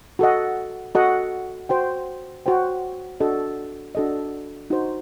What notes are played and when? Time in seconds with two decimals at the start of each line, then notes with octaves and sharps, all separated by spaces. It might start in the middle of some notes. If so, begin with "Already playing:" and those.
0.19 F#4 A4 D#5 F#5
0.95 F#4 A4 D#5 F#5
1.69 F#4 C5 G5
2.46 F#4 C5 G5
3.20 D4 F#4 A4 D#5
3.95 D4 F#4 A4 D#5
4.70 D#4 F#4 C5